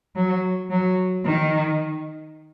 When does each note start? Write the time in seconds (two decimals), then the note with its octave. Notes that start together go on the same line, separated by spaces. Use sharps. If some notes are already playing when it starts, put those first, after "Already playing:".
0.16 F#3
0.70 F#3
1.25 D#3